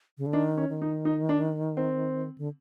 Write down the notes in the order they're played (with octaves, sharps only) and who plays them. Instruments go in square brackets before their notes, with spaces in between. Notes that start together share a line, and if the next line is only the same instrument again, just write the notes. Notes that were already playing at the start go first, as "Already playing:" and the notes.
[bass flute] C#3
D3
[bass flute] D#3 [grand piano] D4
[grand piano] C#4
[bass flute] D#3
[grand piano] D#4
D#4
D4
C4
[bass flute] D3